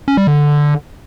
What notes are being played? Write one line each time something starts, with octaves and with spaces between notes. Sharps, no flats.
C#4
G3
D3